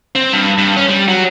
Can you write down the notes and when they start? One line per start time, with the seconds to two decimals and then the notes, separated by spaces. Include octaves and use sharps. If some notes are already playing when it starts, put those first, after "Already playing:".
0.15 C4
0.32 G2
0.58 G2
0.77 C#4
0.89 G3
1.08 F#3